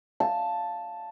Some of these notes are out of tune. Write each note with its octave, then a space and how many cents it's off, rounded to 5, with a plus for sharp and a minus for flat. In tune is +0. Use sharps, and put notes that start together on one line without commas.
F5 +0 A5 +0